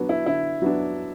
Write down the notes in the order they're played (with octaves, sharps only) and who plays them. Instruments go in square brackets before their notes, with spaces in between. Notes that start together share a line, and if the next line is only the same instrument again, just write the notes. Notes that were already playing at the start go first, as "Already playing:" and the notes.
Already playing: [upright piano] D3 F#3 B3 D4
[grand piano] E4
[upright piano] D3 [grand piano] E4
[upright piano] F#3 B3 D4